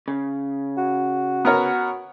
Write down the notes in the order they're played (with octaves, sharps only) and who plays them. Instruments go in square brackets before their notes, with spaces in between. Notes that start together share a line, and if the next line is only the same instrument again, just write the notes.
[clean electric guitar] C#3
[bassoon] F#4
[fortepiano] B3 A#4 C#5